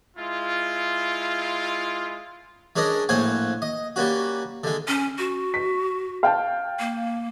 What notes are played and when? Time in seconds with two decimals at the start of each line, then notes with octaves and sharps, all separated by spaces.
0.16 G#3 E4 F4
2.76 G#3 C#4 D4 A#4 D#5
3.09 A#1 A2 C5 C#5 F#5 G#5
3.62 D#5
3.96 G3 A#3 C#4 F#4
4.64 D3 G#3
4.88 C#4
5.18 F#4
5.54 B6
6.23 F5 G5 A5
6.79 A#3